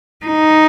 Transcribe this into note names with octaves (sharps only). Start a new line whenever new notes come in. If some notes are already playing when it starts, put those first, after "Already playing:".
D#4